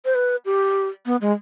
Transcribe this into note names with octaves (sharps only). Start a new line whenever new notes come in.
C5
B4
G4
B3
G#3